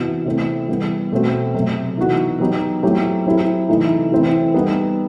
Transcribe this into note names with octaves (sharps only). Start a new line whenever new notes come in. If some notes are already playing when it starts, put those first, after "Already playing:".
Already playing: C3 E3 B3 F#4
C3 E3 A3 C4
E3 G3 B3
B2 A3 C4 F#4
C3 F#3 A3
E3 B3 D#4 F#4
F#3 B3 D#4 G4
F#3 A3 C4 E4 G4
F#3 C4 E4 G4
C3 E3 A3 D#4
E3 A3 C4 E4
G3 B3 D#4 G4